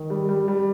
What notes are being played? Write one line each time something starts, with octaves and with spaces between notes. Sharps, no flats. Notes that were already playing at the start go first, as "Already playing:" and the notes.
Already playing: D#3
G3
G3
G3